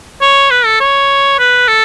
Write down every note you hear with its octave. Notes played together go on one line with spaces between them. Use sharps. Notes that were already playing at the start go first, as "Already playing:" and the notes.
C#5
B4
A4
C#5
B4
A4